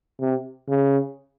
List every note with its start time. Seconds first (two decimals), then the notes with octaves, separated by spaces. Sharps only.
0.20 C3
0.69 C#3